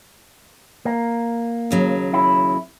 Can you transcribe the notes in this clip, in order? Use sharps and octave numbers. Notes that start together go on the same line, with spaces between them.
A#3
D#2 C#3 F#3
E4